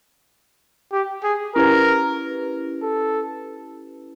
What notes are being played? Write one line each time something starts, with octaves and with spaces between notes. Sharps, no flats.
G4
G#4
C#4 E4 G4 A#4 B4
A4